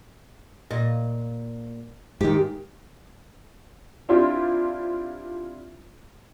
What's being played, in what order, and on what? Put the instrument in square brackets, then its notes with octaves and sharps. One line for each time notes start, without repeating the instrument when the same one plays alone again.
[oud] A#2 D#5
[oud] D#2 G4 [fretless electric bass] G#2 D#3
[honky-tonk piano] C4 D4 E4 F4 G4